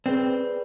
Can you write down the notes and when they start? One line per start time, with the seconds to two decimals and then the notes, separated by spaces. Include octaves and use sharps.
0.06 C4 G#4 B4 D5